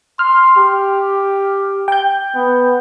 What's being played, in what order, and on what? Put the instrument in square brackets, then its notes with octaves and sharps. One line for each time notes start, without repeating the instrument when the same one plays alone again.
[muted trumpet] C6 [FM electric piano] F6
[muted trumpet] G4
[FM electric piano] G5 G6
[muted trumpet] B3